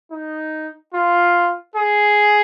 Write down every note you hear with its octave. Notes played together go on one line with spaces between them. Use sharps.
D#4
F4
G#4